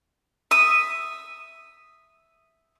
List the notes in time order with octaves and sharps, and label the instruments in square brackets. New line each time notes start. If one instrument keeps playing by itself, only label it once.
[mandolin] E5 D#6